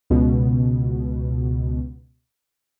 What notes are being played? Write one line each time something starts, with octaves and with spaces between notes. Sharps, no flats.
C#2 B2